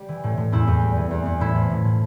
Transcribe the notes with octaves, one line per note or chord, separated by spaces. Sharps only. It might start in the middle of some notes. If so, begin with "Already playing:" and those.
Already playing: G3
E3
A2
A2
E2 E4
E2
G3
E3
E2
E2
A2 E4
F3
A2
F3